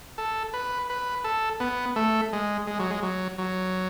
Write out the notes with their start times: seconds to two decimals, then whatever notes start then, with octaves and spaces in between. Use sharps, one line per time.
0.18 A4
0.53 B4
0.90 B4
1.24 A4
1.60 B3
1.96 A3
2.33 G#3
2.67 G#3
2.80 F#3
2.91 G#3
3.03 F#3
3.38 F#3